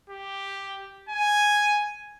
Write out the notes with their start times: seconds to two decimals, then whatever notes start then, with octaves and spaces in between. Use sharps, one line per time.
0.10 G4
1.09 G#5